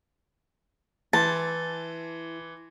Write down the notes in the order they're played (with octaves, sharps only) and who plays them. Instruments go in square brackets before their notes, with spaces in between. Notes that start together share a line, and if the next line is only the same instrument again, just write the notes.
[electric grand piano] E3 [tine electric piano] E4 C6 [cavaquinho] A5